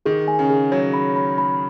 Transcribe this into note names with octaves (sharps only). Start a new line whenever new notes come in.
D#3 G#4
G#5
C#3
G#4
F#3 C#5
B5
B5
B5